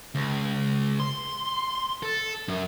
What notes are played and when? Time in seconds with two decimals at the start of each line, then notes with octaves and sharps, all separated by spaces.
0.15 C#2
1.00 C6
2.03 A4
2.48 F#2